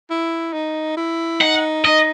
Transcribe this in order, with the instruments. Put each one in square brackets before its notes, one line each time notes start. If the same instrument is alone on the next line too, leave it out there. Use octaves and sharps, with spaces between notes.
[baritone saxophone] E4
D#4
E4
[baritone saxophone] D#4 [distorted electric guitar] F#5
[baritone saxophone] D#4 [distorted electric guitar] D#5